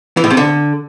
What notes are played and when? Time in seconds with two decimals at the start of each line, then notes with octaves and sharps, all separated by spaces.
0.17 E3
0.24 A2
0.30 C3
0.37 D3